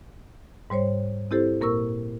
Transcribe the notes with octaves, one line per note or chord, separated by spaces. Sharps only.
G#2 G3 C5 C#5
C4 E4 G4 A4 C5
A#2 A#3 A#4 C#6 E6